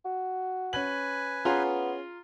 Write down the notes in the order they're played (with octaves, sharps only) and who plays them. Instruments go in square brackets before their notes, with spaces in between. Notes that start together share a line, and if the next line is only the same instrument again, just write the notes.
[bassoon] F#4
[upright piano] C#4 F#7 [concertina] B4 G#5
[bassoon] B3 [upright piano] C#4 G#4 [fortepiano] F4 A#5 C6